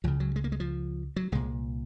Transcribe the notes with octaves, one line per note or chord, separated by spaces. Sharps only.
C#2 C#3 F3
F#3
G#3
A#3
G#3
F3
F#3
C2 A#2 G#3